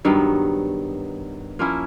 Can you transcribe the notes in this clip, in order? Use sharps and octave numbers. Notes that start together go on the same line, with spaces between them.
G2 D#3 F#3 B3
F3 A#3 C#4 E4